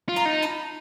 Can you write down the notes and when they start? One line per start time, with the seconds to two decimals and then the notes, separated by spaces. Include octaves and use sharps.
0.09 F4
0.16 A#5 C6
0.26 D#4
0.42 A5 B5